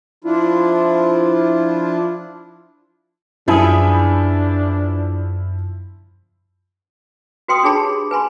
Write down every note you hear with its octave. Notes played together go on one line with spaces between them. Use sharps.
F3 D4 E4 F4
F#2 F3 B3 D4 E4 G#4
F#4 B4 G5 C6 D#6
D4 D#4 G#4 C#5 A5 B5
G4
B4 G#5 B5 C6